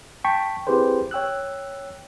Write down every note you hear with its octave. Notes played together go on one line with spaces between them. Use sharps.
G5 A5 C#6 B6
C4 E4 G4 G#4 B4 C5
C#5 G5 E6 F#6